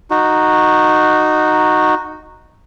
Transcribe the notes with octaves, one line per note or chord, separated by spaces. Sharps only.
D#4 F#4